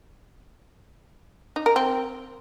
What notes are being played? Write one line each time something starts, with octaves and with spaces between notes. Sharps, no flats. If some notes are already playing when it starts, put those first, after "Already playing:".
D#4
A#4
C4